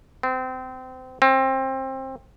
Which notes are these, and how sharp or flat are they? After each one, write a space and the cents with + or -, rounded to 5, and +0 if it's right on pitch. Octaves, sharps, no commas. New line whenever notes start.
C4 -25
C4 +25